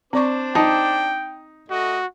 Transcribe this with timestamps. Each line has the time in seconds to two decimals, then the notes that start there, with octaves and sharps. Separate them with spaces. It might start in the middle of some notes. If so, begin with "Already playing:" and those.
0.13 C4 D4 C5 D5 C#6 D6
0.55 D#4 G5 A5
1.70 A3 F#4 D#5